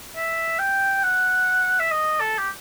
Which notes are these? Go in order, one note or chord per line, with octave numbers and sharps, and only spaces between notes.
E5
G5
F#5
E5
D#5
A4
G4